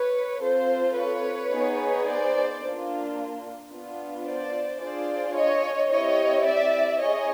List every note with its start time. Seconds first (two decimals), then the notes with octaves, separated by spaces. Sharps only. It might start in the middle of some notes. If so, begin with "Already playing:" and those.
Already playing: B4 C#5
0.42 C4 F4 A4 C5
0.97 B4 C#5
1.52 B3 D#4 G#4
2.07 C5 D5
2.62 A#3 D4 F4
3.71 B3 D4 F4
4.26 C5 D5
4.81 D4 F4 G#4 C5 D5
5.35 C#5 D#5
5.90 C4 E4 G4 C#5 D#5
6.45 D5 E5
7.00 C4 E4 G#4 C#5 D#5